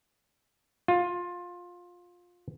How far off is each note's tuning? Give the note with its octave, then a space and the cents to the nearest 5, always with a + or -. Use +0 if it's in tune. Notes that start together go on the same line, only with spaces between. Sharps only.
F4 +20